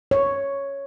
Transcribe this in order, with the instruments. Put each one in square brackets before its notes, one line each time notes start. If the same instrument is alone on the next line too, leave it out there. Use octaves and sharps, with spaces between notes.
[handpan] C#5